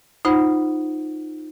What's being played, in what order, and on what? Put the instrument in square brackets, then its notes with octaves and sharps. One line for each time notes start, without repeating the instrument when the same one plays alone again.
[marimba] D#4 F4 C5 F#5 B5